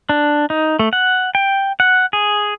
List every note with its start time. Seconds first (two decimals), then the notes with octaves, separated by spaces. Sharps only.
0.09 D4
0.50 D#4
0.79 A3
0.93 F#5
1.35 G5
1.80 F#5
2.13 G#4